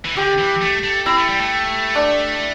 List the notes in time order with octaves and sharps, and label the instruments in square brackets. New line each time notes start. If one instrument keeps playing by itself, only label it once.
[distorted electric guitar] E3
[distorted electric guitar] D3 [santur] G4
[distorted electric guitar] E3
A3
A3
[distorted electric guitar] C4 [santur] E4
[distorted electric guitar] A3
G3
A3
[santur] D4